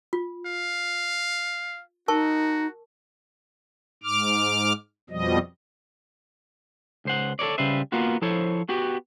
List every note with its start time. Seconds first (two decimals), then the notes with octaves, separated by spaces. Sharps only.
0.13 F4
0.46 F5
2.08 D#4 F#4 A#4 A5 C#6
4.03 G#2 D6 F6
5.10 F2 B2 F3 G3 D#5
7.05 C#2 C5 F#5
7.39 A4 A#4 C#5 D5
7.58 C#3 G3 B4 C5 E5
7.92 A#3 B3 F4 F#4
8.22 F3 E4 A4 C5 C#5
8.69 B3 F#4 G4